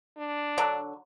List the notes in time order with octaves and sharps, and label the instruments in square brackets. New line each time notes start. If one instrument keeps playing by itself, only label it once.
[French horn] D4
[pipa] D3 F#3